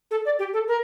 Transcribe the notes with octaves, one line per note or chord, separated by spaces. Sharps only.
A4
D5
G4
A4
A#4